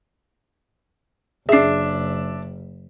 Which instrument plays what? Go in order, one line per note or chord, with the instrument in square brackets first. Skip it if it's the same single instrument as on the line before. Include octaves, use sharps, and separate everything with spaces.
[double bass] F#1 [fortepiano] D4 E5 [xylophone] G#4 C7